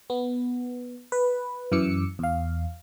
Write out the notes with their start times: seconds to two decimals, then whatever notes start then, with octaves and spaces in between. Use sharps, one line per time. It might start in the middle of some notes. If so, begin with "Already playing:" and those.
0.10 B3
1.12 B4
1.72 F#2 E3 D6 E6 C#7
2.19 E2 F5